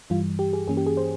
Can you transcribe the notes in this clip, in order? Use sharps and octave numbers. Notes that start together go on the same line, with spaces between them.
G2 E3 G3 F4
G4
G#4
G2 E3 A#3 C#4 G#4
G4
G#4
C5